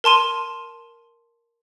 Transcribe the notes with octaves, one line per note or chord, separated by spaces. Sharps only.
A#4 A5 C6 D#7